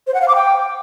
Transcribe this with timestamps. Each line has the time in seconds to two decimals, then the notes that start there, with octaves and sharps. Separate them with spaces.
0.07 C5
0.14 F#5
0.21 F5
0.28 D6
0.35 G5